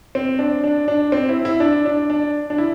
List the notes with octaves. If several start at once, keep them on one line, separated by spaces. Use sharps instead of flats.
C4
D4
D4
D4
C4
E4
E4
D4
D4
D4
D4
E4